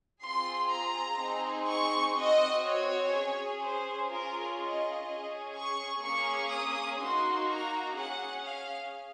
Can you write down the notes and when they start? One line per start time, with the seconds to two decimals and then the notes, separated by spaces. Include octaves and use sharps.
0.24 C4 F4 G#4 C6
0.72 A#5
1.20 C4 D#4 G#4
1.69 C#6
2.17 C4 F#4 D#5
2.65 C#5
3.13 C#4 G#4
3.62 C5
4.10 C#4 F4 G#4 A#4
4.58 D#5
5.06 C#4 G#4
5.55 C#6
6.03 A#3 C#4 G#4 C#6
6.51 D#6
6.99 A#3 D#4 F#4 C6
7.48 A#5
7.96 C#4 G#4 F#5
8.44 F5